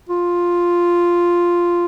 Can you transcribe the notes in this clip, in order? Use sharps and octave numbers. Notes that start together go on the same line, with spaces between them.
F4